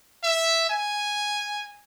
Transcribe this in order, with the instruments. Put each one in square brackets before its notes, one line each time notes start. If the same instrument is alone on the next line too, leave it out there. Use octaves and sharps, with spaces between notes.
[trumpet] E5
G#5